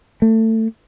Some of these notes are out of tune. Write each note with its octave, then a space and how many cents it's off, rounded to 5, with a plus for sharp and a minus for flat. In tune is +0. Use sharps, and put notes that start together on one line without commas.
A3 +20